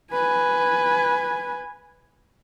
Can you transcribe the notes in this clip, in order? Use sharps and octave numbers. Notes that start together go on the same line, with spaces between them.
B4 G#5